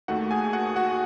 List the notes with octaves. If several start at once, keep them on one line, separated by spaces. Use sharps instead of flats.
D#2 D#3 A3 F#4 F#5
G#4 G#5
F#4 F#5
F#4 F#5